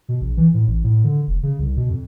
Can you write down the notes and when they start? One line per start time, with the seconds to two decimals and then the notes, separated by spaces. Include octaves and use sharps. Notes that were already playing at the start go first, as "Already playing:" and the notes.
0.09 B2
0.21 A#1
0.37 E3
0.54 A2
0.67 A1
0.84 A2
1.04 D3
1.27 F1
1.43 C#3
1.59 C2
1.77 B2
1.90 F2